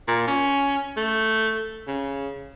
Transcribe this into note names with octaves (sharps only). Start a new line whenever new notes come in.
A#2
C#4
A3
C#3